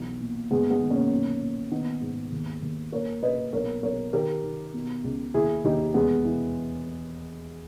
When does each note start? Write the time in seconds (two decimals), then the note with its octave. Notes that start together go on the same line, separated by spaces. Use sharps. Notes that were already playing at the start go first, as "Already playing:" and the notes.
Already playing: B1 E3
0.20 A#2
0.51 G1 G#3 B3
0.70 G#3 B3
0.80 D#3
0.90 A#3 C#4
1.11 B1
1.41 A#2
1.71 D#3 B3 D#4
2.01 G#2
2.32 D#2
2.62 D#2
2.92 A#2 A#4 C#5
3.23 A#2 B4 D#5
3.53 B1 A#4 C#5
3.83 B1 A#4 C#5
4.13 D#3 G4 A#4
4.44 D#3
4.74 B2
5.04 C#2
5.34 D#2 E4 G#4
5.64 D#2 D#4 G4
5.94 E1 G#3 B3
6.25 E3